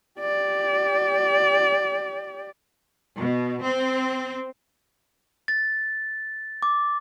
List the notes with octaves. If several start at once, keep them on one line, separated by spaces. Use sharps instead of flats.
G4 D5
B2
C4
A6
D6